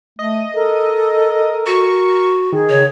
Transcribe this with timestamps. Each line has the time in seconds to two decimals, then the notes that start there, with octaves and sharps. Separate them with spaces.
0.19 A3 D#5
0.54 A4 A#4
1.66 F#4 C#6
2.53 D#3 G#4
2.69 C#3 C#5